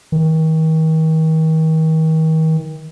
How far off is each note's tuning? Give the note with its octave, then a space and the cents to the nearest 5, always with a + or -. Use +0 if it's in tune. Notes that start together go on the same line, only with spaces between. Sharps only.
D#3 +40